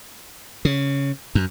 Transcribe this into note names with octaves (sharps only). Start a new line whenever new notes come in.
C#3
F#2